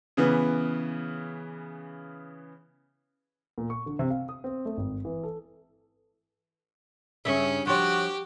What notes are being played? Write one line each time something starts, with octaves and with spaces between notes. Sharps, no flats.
C#3 E3 B3
A#2
C#6
D3
C3
F5
D#6
C4
A3
G#1
E3
A4
G2 C#3 C#4 E5
F3 F#4 G4 C#5